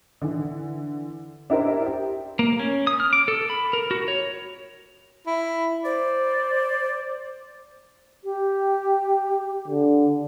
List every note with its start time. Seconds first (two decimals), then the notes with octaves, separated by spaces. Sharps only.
0.22 D3 E3
1.50 D4 E4 G4 A#4 C5
1.86 G4
2.39 A#3
2.59 C#4
2.87 D#6
3.00 F6
3.13 D6
3.28 A4
3.50 B5
3.73 A#4
3.91 F#4
4.08 C#5
5.27 E4
5.85 C5 D5
8.24 G4
9.68 D3